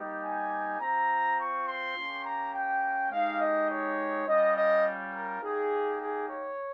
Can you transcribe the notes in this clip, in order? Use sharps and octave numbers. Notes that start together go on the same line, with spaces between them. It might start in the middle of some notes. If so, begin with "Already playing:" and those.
Already playing: G3 A#3 D#4 G4
G#5
C4 F4 A#5
C#6
C6
A#3 C#4 G4
A#5
G5
G#3 D#4 G4 F5
D#5
C#5
G3 C#4 F4 D#5
D#5
A#4
A#3 D#4 G4 G#4
G#4
C#5